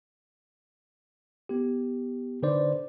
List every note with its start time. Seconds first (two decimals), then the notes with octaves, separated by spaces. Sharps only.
1.49 B3 G4
2.43 D3 D#4 B4 C5 D5